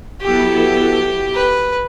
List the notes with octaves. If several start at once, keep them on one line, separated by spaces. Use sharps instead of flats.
F#3 B3 E4 G4 A4
B4